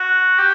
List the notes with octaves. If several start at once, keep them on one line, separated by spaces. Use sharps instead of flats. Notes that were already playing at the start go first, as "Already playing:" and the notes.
Already playing: F#4
G4